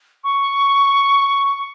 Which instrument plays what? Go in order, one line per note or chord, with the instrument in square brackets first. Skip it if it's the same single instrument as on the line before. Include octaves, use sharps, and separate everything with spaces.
[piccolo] C#6